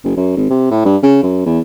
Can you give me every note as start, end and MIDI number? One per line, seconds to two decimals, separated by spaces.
0.04 0.13 30
0.16 0.35 42
0.37 0.49 32
0.50 0.69 48
0.71 0.84 45
0.85 0.96 43
1.03 1.21 49
1.22 1.45 42
1.46 1.59 40